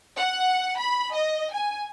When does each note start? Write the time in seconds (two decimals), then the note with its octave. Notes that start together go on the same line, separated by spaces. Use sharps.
0.17 F#5
0.79 B5
1.15 D#5
1.52 G#5